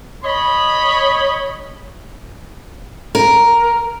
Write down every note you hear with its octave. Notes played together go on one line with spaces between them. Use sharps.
C#5 D#5 B5
A#4